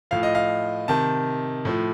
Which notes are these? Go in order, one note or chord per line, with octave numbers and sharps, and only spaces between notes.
A2 F3 F5
D#5
F5
C3 D#3 A5
A2 F3